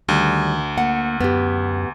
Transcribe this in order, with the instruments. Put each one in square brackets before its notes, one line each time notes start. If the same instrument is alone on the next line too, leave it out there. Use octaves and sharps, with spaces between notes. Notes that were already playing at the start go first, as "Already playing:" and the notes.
[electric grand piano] D2 [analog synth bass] D#3 [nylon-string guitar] G3
[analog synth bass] A#3 [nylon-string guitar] F#5
[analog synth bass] F#2 [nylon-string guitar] B3 G4